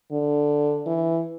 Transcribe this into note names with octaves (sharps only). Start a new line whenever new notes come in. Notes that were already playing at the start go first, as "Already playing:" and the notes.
D3
E3